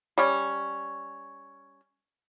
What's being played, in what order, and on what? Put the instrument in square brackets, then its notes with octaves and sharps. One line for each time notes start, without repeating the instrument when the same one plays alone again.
[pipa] G3 C#4